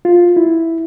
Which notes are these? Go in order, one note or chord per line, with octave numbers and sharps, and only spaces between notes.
F4
E4